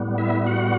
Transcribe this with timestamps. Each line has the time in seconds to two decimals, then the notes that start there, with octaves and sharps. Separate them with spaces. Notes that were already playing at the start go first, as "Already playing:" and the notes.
Already playing: A2 G3 B3
0.18 E4 E5
0.46 F#4 F#5